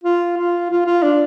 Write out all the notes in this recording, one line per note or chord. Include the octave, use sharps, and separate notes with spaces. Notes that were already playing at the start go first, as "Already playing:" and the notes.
F4
F4
F4
F4
D4